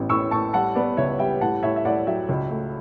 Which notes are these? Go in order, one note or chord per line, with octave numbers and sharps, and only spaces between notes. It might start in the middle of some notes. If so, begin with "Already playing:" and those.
Already playing: A1 B3
A2 C#6 E6
A2 A5 C#6
G3 F#5 A5
B3 D5
C#2 C#5 E5
G3 E5 G5
A2 F#5 A5
A2 C#5 E5
E5
A2 D5 F#5
F#3 E5 G5
C#2
A3